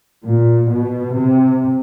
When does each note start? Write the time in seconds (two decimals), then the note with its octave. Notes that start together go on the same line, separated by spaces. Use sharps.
0.24 A#2
0.70 B2
1.16 C3